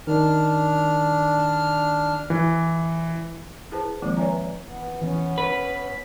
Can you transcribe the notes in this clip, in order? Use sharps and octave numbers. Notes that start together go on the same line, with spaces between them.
D#3 D4 F6
E3
E4 G#4 B4 C5 A5
D#3 F3 G#3 A#3 C4 E4
B4 C#5 D5 E5 G#5 A#5
E3 B3
E3 B3 C#4
B4 B6